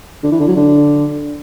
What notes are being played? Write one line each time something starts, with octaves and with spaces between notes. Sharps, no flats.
D3
E3
D3
F#3
D3